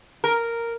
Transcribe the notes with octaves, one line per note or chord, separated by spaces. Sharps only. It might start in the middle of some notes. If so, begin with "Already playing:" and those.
A#4